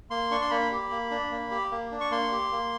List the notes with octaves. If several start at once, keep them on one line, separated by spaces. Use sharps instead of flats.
A#3 C6
D4 C#6
C6
A#3 B5
G4
A#3
D4
A#3
G4
A#3
D4
C#6
A#3 C6
G4
A#3